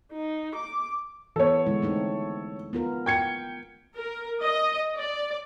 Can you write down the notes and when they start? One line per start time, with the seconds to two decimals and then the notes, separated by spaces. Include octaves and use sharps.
0.12 D#4
0.55 D6
1.36 E3 B3 A4 C#5
1.66 D3 G#3 E4
1.82 A3 C4 D#4
2.73 B3 F4 A#4
3.06 G5 G#6 C#7
3.95 A#4
4.43 D#5
4.96 D5